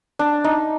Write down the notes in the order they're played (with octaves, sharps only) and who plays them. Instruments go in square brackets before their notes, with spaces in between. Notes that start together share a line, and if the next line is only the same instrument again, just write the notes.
[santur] D4
D#4